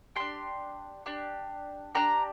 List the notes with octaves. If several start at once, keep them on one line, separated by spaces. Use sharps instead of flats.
D4 G4 C6
D4 G4
D4 G4 A#5